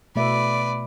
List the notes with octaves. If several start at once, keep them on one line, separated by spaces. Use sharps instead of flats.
B2 A3 B4 D5 E5